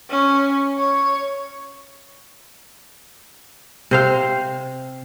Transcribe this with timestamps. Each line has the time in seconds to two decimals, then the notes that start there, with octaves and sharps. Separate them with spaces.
0.10 C#4
0.78 C#5
3.91 C3 C5 F5